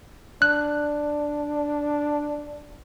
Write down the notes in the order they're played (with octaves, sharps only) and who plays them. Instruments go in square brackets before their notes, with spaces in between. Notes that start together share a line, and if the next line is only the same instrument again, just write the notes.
[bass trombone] D4 [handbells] F#6